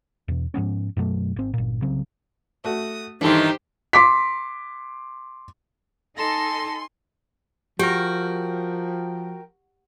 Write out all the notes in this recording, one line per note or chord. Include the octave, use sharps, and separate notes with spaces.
E2 B2
G#2 F3 B3 C#4
F#2 B2 F#3 A3
G#1 C4
G1 A#2
C2 C#3 F#3 C4
A3 F#4 D#6
G2 D#3 E3 D#4 G4 A4 C5 C6
C6 D6 B6
D#4 A4 G#5 A5 C6 A#6
F3 F#4 G4 A#4 G5